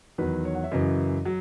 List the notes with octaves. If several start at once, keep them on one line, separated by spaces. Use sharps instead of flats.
E2 D#3 F#3 B4
C#5
F#5
E5
F#2 C#3 E3 D#5
F#3